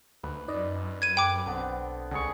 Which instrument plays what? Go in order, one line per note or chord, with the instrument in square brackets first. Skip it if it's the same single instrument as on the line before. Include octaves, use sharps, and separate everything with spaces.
[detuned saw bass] D2 [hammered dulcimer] B4
[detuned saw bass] F#2 [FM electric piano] D#4 D5 D#5
[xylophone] G#6 D#7
[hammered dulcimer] A4 B4 [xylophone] G5 D6 [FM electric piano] G#6
[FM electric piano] B1 [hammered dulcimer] D3 B3 C4
[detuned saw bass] C#2 [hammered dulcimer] D3 G#4 C#6